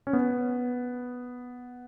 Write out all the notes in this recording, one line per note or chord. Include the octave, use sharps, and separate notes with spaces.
C#4
B3